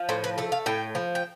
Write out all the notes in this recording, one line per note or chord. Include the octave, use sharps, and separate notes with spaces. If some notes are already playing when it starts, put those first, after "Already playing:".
Already playing: F3
A2 C5
B4
A3 A4
F5
A2 G5
F3
G5